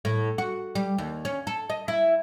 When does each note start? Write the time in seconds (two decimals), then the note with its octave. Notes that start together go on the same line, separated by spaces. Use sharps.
0.05 A2
0.38 F#4
0.75 G3
0.98 D#2
1.25 C#4
1.47 A4
1.70 D#5
1.88 E4